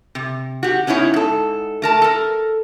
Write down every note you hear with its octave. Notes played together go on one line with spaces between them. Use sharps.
C3
F#4 G4
B3 C#4 D#4 E4 C#5
G#2 A4
A3 A#4 A5
A4 A#4